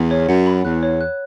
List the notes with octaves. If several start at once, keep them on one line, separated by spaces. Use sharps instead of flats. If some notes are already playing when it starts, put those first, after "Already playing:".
Already playing: E2
C#5
F#2 F#5
B5
E2 F#6
C#5
F#6